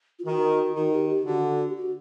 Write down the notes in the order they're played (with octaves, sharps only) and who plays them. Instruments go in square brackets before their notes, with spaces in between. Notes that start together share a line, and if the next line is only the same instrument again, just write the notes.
[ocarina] F4
[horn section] D#3 [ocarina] F#4
[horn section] D#3 [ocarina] F#4
[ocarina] G4
G4
[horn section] D3 [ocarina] F#4
[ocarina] G4
F#4